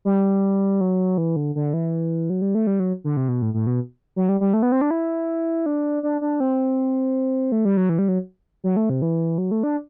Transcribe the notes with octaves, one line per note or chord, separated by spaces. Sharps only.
G3
F#3
E3
D3
D3
E3
F#3
G3
A3
G3
F#3
D3
C3
B2
A2
A2
B2
F#3
G3
G3
A3
B3
C4
D4
E4
D4
D4
D4
C4
A3
G3
F#3
E3
G3
F#3
F#3
A3
C3
E3
F#3
A3
D4